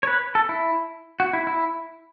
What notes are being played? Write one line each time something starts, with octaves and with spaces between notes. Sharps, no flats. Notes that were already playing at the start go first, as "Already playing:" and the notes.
C#5
B4
A4
E4
F#4
E4
E4